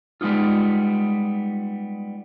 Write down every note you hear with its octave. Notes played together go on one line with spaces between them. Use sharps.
G3 G#3 B3 D#4 F4